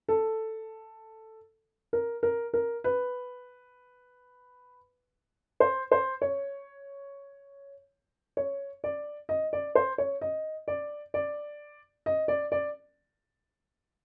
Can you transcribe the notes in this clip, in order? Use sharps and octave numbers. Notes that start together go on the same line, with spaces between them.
A4
A#4
A#4
A#4
B4
C5
C5
C#5
C#5
D5
D#5
D5
C5
C#5
D#5
D5
D5
D#5
D5
D5